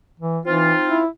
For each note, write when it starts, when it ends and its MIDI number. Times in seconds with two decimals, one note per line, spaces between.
0.20 0.39 52
0.46 0.73 52
0.46 1.00 60
0.46 1.00 63
0.46 1.00 65
0.89 1.07 64